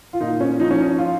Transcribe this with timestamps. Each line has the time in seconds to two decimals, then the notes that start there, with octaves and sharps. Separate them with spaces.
0.13 F4
0.21 A#2 D#4
0.40 C#4
0.60 F3 D#4
0.71 C#4
0.80 D#4
0.98 F4